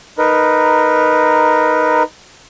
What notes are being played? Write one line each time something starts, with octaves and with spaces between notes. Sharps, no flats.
D#4 A#4 B4